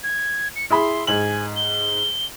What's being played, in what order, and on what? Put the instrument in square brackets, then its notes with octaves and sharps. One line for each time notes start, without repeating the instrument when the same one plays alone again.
[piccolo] G#6
C#7
[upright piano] E4 G#4 B5 [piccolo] C6
[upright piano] G#2 F#7 [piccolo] G#5
[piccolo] G7